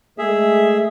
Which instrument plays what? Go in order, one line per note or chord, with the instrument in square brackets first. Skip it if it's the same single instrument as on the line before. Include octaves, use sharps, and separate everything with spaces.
[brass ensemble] G#3 A3 [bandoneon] G#4 E5